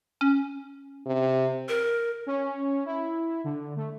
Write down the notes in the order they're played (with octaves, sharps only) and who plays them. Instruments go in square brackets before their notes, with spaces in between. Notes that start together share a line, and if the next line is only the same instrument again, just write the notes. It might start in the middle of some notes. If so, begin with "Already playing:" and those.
[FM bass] C#4
[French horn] C3
[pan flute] A#4
[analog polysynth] C#4
E4
D3
A3